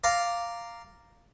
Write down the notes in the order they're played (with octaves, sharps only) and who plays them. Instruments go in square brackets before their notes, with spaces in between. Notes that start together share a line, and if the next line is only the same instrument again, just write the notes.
[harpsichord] D5 F5 A#5